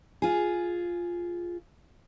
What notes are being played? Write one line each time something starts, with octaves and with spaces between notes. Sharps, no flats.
F4 G#4